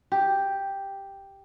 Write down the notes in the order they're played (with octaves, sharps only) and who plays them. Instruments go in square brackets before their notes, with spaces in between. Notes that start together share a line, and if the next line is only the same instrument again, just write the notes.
[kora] G4